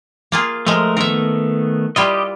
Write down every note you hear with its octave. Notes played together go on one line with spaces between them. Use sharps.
A#3 F4 G#4
F3 G#3 A3 A#4
D#3 A3 B3 A#4 E5
G3 E4 F4 G4 D#5